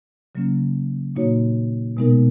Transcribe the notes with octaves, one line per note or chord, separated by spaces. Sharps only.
C#3 F#3 A#3 C#4
A#2 A#3 D#4 F#4 C#5
B2 G#3 B3 D#4 A#4